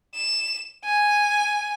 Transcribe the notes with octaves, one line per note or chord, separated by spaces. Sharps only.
E7
G#5